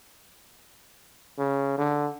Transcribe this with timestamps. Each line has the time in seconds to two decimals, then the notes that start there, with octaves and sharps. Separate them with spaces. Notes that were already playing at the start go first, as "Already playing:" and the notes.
1.39 C#3
1.78 D3